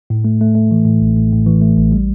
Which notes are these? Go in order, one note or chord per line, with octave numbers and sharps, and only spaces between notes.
A2
A3
A3
A3
E3
A2
A1
A2
A2
E3
A3
A1
G3